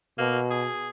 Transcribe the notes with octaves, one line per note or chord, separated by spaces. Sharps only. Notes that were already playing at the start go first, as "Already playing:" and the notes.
B2 A#3
G#4